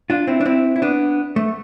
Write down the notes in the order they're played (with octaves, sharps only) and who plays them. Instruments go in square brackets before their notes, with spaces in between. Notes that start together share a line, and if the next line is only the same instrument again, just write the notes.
[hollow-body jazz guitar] D4 F4
C4 E4
D4
C4 E4
E4
B3 D4
A3